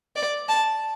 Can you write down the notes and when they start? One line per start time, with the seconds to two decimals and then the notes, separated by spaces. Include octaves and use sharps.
0.16 D5
0.49 A5